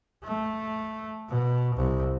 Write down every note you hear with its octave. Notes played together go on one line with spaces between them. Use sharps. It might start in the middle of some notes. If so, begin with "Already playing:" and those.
A3
B2
C2